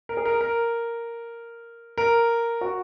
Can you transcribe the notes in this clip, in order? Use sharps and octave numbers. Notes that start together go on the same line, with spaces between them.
A#4
G#4
A#4
A#4
A#4
F#4